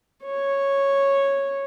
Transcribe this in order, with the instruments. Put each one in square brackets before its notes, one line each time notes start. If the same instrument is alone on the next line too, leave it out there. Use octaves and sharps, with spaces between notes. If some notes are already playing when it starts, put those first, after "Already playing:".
[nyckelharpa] C#5